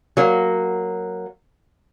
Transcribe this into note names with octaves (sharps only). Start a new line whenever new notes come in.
F#3 A#3